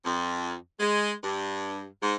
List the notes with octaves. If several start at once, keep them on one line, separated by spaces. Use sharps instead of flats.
F2
G#3
G2
G#2